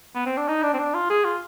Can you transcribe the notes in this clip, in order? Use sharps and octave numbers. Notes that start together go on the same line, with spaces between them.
B3
C4
D4
D#4
D4
C4
D4
F4
G#4
F4